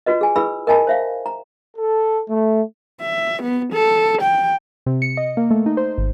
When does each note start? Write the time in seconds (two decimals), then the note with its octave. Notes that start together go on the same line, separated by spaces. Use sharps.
0.06 F4 F#4 B4 D#5
0.21 G#4 G#5
0.36 E4 G#4 B4 B5 E6
0.67 A#4 D#5 G#5 A5 B5
0.87 C5 E5 F5
1.26 A#5
1.77 A4
2.29 A3
3.01 E5
3.43 B3
3.73 A4
4.22 G5
4.86 C3
5.02 C#7
5.17 D#5
5.37 A#3
5.51 A3
5.66 D#4
5.77 C5
5.98 G#1